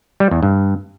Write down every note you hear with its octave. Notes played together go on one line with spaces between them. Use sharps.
G3
E2
G2